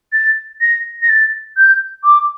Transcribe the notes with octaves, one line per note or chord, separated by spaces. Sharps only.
A6
A#6
A#6
A6
G6
D6